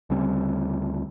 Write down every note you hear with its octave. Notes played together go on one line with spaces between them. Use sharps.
D2 C#3 G3 C4